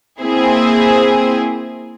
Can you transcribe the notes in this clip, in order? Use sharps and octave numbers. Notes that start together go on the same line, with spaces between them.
A#3 C4 E4 G#4 C5 G#5